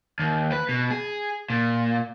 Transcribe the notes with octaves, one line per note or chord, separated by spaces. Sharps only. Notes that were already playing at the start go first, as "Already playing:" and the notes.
D#2
B4
B2
G#4
A#2